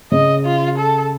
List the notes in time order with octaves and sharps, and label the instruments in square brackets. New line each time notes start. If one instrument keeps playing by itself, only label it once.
[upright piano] C#3 [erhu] D#5
[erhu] F4
A4